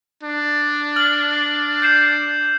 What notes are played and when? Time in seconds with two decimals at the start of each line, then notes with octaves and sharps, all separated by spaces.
0.23 D4
0.96 F6 F#7
1.82 G6 C7 E7